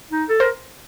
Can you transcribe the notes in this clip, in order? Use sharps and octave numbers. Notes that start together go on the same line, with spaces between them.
D#4
A4
A#4 C5